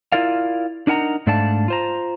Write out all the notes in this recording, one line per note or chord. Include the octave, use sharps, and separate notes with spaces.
E4 F4 A#4 D5 F5
D4 D#4 A#4 F#5 A5 A#5
G#2 A3 D4 D5 F5 A5
F4 C5 A#5